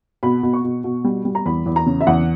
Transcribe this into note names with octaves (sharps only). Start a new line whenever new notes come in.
B2 B5
B2
C#6
B2
B2
G3
G3
A#5
E2 B5
E2
A#5
C#3
E5
E2 F#5